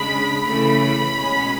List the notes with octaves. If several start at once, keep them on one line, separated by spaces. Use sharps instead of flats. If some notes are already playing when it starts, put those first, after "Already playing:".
Already playing: C#3 G#3 D4 B5
C#3 E3 A3 B5
B2 G#3 C#4